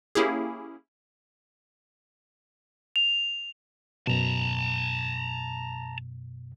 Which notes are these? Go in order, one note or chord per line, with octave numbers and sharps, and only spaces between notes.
A#3 C#4 E4 G4 G#4
F7
F#2 B2 A5 A#5